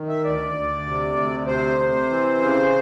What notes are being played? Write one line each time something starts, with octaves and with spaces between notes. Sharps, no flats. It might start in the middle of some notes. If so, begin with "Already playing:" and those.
Already playing: D#3
E5
D2 D5
D2
C3
D2
C3 C5
C3
E3
C#3